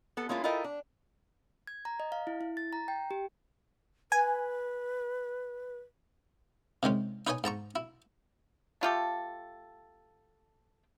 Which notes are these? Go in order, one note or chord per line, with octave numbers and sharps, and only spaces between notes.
B3 A4
G#3 A#3 C#4 E4 F4
E4 F4 A4 A#4 D#5 G5
D4
G#6
A#5
D#5
F5
E4
E4
A6
A#5
G5
G4
B4 G#5
C3 D#3 G#3 C#4
D#4 B4 C#5 D#5 G#5
G#2 A5 A#5 C#6
E4
A3 F4 G4 A4